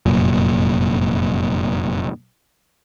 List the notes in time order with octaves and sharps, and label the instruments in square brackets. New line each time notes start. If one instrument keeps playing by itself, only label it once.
[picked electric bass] F1 F#2 A#2